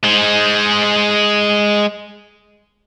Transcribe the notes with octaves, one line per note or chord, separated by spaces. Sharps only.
G#3 C5